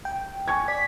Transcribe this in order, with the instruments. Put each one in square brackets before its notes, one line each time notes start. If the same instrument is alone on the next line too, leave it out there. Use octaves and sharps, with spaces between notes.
[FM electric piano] G5
[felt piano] G#5 C#6 G#6
[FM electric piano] D5 [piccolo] B6